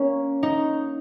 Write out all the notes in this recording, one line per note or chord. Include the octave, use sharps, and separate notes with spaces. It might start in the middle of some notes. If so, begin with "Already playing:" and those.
Already playing: A#3 C#4
D#4